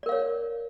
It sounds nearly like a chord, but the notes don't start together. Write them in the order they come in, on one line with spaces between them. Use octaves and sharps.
D5 A#4 F5 C#5